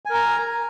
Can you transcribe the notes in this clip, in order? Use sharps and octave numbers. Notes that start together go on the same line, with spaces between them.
A#4 G#5 A#5